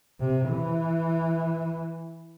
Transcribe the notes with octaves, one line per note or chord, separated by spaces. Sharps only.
C3
E3